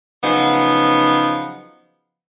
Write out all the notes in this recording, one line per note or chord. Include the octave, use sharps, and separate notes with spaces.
C#3 F3 F#3 B3 D#4